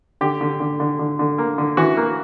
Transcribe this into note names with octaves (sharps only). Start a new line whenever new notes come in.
D3 G4
D3
D3
D3
D3
D3
A#3
D3
E3 F#4
A#3